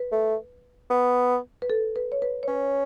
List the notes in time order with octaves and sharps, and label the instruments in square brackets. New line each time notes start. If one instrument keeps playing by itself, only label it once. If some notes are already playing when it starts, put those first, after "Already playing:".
Already playing: [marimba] B4
[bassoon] A3
B3
[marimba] B4
A4
B4
C#5
B4
C#5
[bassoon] C#4 [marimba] B4